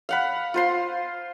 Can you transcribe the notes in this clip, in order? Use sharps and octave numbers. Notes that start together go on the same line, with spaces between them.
F5 F#5 B5
F4 C5 C6